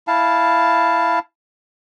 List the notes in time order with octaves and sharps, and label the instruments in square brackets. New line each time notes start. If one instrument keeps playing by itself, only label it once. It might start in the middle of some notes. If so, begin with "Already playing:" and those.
[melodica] E4 F5 A5